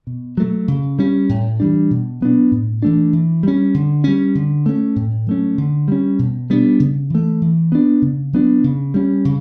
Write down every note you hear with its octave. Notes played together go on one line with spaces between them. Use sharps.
B2
F#3 A3
C#3
G3 C#4
A2
E3 G3 D4
B2
F#3 B3 D4
A2
E3 A3 D4
E3
G3 C#4
D3
G3 C#4
D3
A3 C#4
A2
F#3 A3 C#4
D3
G3 C#4
B2
G3 B3 D4
C#3
E3 A3
E3
B3 D4
C#3
F#3 B3 D4
C#3
G3 C#4
C#3